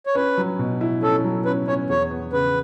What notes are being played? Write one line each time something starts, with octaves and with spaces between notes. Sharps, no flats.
C#5
C#4 B4
F#3
B2
E4
C#4 A4
F#3
C#4 B4
C#4 C#5
E2 C#5
B3
C#3 B4